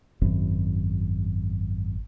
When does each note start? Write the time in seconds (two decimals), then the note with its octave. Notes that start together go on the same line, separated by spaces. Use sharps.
0.21 G#1 F#2